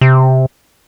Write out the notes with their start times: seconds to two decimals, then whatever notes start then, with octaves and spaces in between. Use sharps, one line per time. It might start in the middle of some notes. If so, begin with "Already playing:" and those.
0.01 C3